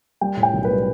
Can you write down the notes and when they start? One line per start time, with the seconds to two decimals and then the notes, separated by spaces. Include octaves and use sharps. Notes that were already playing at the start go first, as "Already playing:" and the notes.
0.21 G3 G5
0.37 A2
0.43 G5
0.53 B1
0.65 B4
0.71 G3